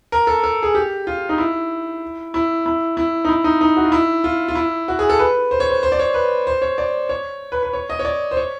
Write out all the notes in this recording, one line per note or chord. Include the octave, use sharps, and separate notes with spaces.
A#4
A4
A4
G#4
G4
F4
D#4
E4
E4
E4
E4
D#4
E4
D#4
D#4
F#4
F4
E4
F4
F4
E4
F#4
G#4
A4
B4
C5
C#5
C5
C5
D5
C#5
B4
C5
C#5
D5
C#5
B4
B4
C#5
D#5
C#5
D5
C5
C#5